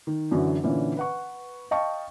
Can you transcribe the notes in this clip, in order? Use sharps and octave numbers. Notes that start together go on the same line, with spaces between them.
D#3
F#2 D3 E3 F#3
A#2 D3 E3 C#4
B4 F#5 C#6
D#5 F5 G5 A5 C#6